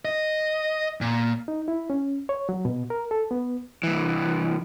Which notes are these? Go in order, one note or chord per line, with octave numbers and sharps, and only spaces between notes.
D#5
A#2
D#4
E4
C#4
C#5
F#3
B2
A#4
A4
B3
C2 E3